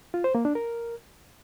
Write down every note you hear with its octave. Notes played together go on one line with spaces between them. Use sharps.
F4
C5
A#3
D4
A#4